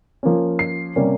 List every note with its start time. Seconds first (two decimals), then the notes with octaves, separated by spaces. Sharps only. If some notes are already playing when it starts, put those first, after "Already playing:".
0.23 F3 A#3 C#4
0.59 C7
0.96 C3 G3 A#3 C#4